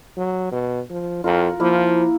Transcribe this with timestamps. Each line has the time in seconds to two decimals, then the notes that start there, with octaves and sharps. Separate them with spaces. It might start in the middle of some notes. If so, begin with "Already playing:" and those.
0.17 F#3
0.52 B2
0.90 F3
1.24 F2 F4 A#4 F#5
1.60 F3 A#3 E4